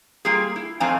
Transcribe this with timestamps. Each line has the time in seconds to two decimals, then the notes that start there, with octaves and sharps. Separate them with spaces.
0.25 G3 A#3 F4 G4 G#4
0.56 E4
0.80 F2 A2 F3 C4 G#5 A#5